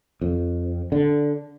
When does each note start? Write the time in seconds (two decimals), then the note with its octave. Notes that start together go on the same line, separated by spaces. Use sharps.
0.21 F2
0.92 D3